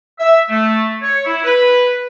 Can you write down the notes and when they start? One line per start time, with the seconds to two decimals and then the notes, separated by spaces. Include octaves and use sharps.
0.18 E5
0.49 A3
1.02 C#5
1.25 E4
1.44 B4